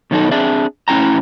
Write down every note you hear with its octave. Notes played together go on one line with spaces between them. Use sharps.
B2 D#3 F#3 B3 D#4 A4
C4 D4 G#4 D5 E5
A2 C#4 E4 G5 A#5